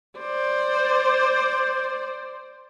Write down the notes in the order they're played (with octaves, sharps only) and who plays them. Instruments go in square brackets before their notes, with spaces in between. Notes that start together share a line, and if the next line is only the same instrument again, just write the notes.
[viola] C5 D5